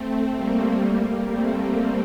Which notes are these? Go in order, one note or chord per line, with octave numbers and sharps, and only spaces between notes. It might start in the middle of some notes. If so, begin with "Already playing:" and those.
Already playing: A3 C4
G3 A#3
A3 C4